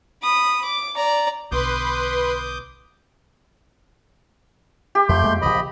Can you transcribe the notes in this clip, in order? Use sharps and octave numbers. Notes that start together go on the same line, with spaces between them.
B5 D#6
D6
D5 A#5
B1 D3 B4 C6 D6 D#6 G6
G4
F2 A3 C6 G6
F2 G#3 A#3
A#1 C#3 F3 D#5 B5